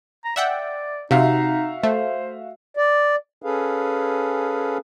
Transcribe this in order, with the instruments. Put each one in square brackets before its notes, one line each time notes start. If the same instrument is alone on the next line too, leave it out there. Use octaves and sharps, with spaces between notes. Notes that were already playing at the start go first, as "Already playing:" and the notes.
[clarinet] A#5
[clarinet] D5 [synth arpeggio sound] E5 F#5 G5
[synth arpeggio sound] C3 [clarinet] D#4 [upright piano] F#4 E5 F5
[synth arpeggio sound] A3 [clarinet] C5
[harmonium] D5
C#4 G#4 A4 B4 F5